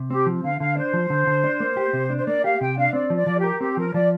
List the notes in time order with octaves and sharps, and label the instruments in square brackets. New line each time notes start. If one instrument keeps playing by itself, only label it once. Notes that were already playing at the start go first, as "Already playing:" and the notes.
Already playing: [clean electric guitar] C3
[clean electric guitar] C4 [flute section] G4
[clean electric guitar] F3
[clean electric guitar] D3 [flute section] F5
[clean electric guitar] D3 [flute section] F5
[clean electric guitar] D4 [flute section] C5
[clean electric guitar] F3
D3
D3
D4
A#3
G4
C3
D4
[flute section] C5
[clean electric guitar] A#3 [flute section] D5
[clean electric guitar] G4 [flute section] F5
[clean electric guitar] C3 [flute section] G5
[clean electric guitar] D4 [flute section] F5
[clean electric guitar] C4 [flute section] D5
[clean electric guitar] F3
[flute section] D5
[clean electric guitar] F3
[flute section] G4
[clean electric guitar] A#4
[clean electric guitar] C4 [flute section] G4
[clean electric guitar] F3 [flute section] A#4
[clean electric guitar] F3 [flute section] D5